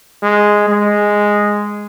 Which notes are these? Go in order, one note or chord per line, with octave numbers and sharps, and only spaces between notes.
G#3
G#3